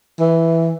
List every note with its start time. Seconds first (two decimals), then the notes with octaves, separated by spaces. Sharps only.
0.20 E3